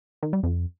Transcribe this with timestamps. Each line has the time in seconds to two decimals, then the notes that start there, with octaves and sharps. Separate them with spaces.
0.23 D#3
0.33 G3
0.43 F2